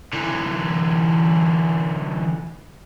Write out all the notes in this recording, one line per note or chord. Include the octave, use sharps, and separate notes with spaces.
D3 E3